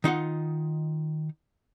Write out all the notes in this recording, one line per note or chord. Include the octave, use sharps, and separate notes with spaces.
D#3 D#4 F4 F#5